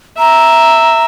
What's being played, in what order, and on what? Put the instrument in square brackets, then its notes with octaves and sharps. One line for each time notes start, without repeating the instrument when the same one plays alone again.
[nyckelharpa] E5 [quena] A#5